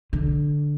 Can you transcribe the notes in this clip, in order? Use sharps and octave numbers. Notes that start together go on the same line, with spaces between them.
D3